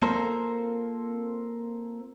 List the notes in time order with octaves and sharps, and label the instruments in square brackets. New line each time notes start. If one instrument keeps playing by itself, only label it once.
[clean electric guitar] A#3 C4 F4 A4 A#4 C5